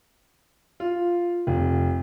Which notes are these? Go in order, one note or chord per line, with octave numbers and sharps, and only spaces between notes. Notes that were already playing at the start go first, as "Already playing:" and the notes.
F4
F1